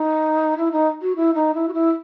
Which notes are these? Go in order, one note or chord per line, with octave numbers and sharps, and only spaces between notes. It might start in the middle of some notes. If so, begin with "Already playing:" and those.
Already playing: D#4
E4
D#4
F#4
E4
D#4
E4
F#4
E4